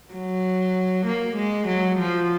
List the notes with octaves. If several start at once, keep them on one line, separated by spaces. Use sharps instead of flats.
F#3
A#3
G#3
F#3
F3